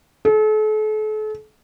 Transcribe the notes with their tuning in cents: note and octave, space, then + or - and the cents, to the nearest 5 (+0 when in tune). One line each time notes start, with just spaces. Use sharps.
A4 -40